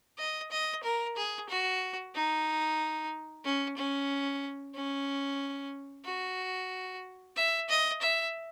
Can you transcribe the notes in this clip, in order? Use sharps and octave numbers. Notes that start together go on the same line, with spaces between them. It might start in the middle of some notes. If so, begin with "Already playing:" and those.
D#5
D#5
A#4
G#4
F#4
D#4
C#4
C#4
C#4
F#4
E5
D#5
E5